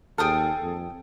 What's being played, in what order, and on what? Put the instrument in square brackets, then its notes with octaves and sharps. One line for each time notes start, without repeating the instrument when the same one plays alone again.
[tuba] D#2 [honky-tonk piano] G#4 A4 [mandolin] G5 D#6 F6
[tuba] F2